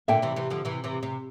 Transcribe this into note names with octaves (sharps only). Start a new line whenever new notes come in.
A#2 D3 E5 G5
C3 E3
C3 E3
D3 F3
C3 E3
C3 E3
C3